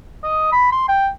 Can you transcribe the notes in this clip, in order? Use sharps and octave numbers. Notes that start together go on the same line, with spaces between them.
D#5
B5
C6
G5